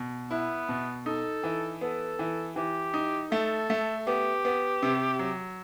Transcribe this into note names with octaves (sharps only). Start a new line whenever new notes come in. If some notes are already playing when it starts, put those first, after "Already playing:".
Already playing: B2
B3 E4
B2
D#4 A4
E3
B3 A4
E3
E3 G4
D#4
A3 A4
A3
B3 G4
B3
C3
F#3